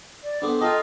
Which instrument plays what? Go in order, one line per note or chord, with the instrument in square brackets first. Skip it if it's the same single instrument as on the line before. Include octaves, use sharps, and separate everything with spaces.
[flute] D5
[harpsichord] B3 C4 [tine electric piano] D4 G#4 A4 [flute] D6
[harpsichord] D#4 A4 [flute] F4 [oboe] D#5 [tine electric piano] G5 A5